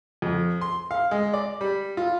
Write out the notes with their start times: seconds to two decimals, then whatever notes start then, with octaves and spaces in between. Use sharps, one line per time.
0.22 F2
0.61 C6
0.91 F5
1.11 G#3
1.34 D5
1.61 G3
1.97 F4